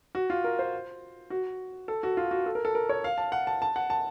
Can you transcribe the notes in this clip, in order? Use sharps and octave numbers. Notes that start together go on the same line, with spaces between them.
F#4
F4
A#4
C5
F#4
A4
F#4
F4
F#4
A4
A#4
A4
A#4
C#5
F5
A5
F#5
A5
A5
F#5
A5